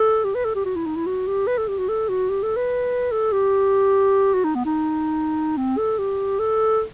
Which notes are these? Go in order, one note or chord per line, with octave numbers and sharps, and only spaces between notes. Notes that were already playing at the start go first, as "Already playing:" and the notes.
Already playing: A4
G4
B4
A4
G4
F#4
E4
D#4
E4
F#4
G4
B4
A4
G4
F#4
A4
F#4
G4
A4
B4
A4
G4
F#4
D#4
B3
D#4
C4
A4
G4
A4